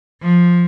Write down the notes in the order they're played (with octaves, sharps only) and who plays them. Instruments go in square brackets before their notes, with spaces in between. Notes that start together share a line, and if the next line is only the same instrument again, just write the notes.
[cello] F3